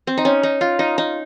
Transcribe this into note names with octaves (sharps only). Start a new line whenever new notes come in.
C4
D#4
C#4
D#4
F4
D#4
D#4